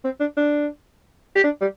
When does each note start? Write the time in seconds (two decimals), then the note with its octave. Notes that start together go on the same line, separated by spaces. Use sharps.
0.05 C4
0.20 D4
0.37 D4
1.36 G4
1.44 D4
1.61 G3